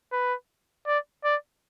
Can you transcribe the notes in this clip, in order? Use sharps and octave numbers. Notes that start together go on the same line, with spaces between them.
B4
D5
D5